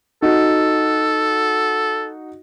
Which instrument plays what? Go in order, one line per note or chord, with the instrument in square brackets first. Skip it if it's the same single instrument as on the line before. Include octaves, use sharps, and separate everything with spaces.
[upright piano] D#4 F#4 [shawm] A4